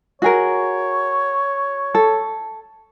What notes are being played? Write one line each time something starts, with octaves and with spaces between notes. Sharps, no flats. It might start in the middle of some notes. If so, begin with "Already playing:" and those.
F#4 G#4 A#4 C#5
A4